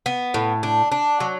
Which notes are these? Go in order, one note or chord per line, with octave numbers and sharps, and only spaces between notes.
B3
A2
D4
D4
F#3